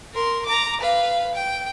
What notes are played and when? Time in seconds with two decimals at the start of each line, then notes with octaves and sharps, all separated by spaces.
0.13 A#4 C6
0.46 A#5 D6
0.80 B4 F5
1.34 G5